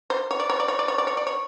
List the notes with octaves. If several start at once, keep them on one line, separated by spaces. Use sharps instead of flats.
C5
C#5
D5
C#5
D5
C#5
D5
C#5
D5
C#5
D5
C#5